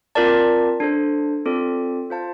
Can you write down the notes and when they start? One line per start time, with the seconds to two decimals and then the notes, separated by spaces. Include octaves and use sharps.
0.15 C4 F4 A#4 D5 A5
0.80 D4 A4 C5
1.45 C4 F4 A4 D5
2.10 F4 C5 F5 A5